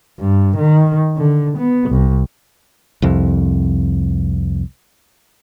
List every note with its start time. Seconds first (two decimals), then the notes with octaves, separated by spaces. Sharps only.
0.19 G2
0.57 D#3
1.17 D3
1.58 B3
1.90 C2
3.02 C2 F2